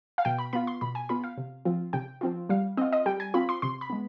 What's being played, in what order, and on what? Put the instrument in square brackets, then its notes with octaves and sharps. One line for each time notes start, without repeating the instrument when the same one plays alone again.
[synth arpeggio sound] F5
B2 G5
B5
B3 F4 B5
C6
B2 B5
G#5
B3 F4 B5
F5
C3
F3 C4 F4
C3 G5
F3 C4 F4
G3 F5
C4 F4 D#5
D#5
G3 G5
G#5
C4 F4 B5
C6
C3 C6
B5
G#3 B3